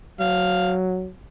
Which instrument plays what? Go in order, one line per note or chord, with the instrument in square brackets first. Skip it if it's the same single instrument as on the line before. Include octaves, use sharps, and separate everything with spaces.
[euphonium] F#3 [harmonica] F5